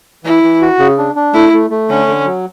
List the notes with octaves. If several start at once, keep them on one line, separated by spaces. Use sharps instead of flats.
E3 E4
E3
F#4
C#3
D4
D4
A3 E4
A3
A3
D3 C#4
D3
F#3